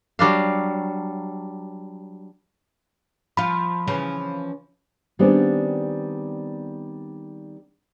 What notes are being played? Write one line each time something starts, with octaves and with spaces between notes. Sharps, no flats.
F#3 G3 D4 F5
F3 F4 B5
C#3 E3 F3
D#3 G3 B3 C4 D4 G#4